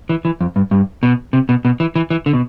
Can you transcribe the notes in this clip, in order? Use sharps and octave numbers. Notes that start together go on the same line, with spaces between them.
E3
E3
F2
G2
G2
B2
C3
B2
B2
E3
E3
E3
D3
B2